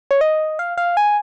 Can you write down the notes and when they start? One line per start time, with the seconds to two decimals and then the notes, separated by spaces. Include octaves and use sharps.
0.11 C#5
0.21 D#5
0.59 F5
0.78 F5
0.97 G#5